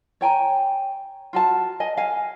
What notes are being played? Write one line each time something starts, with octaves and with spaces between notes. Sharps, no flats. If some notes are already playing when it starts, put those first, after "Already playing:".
C#5 G5 G#5 A#5
F4 F#4 A5
D#5 G#5
F5 G#5